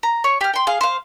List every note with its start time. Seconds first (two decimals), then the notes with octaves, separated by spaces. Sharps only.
0.03 A#5
0.24 C#5
0.41 G4 F6
0.53 G5 C6
0.67 G#4 F5
0.81 C5 F5